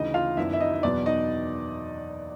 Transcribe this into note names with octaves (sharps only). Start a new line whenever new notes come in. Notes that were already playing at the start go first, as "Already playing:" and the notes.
Already playing: D2 C#3 E3 D#4 D#5
F4 F5
F#2 D#3 F#3 B3 D4 E4 E5
E5
D#4 D#5
D#5
E2 B2 F#3 B3 D5
D#4 D#5